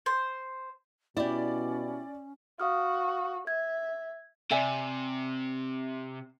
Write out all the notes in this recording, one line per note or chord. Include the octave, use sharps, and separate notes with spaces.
C5
B2 C#4 E4 G4 D5
F#4 F5 D#6 F6
E5 G#6
C3 D5 E5 G#5